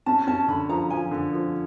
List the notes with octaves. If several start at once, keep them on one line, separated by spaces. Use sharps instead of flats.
C#4 A5
C#4 A5
D3 B5
F3 A#5
F3 G#5
D3
F3